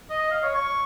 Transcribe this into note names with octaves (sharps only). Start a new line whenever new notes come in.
D#5
F5
C#5
C#6